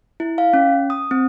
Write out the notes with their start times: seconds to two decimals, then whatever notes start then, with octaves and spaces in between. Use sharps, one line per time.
0.20 E4
0.38 F5
0.53 C#4
0.90 D#6
1.11 C4